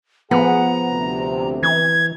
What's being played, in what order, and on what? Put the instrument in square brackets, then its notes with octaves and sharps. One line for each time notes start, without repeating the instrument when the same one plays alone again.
[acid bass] F3 [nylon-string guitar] B3 [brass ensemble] G#4 F#5 [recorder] A#5
[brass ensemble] D2 C3
[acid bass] E3 [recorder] G#6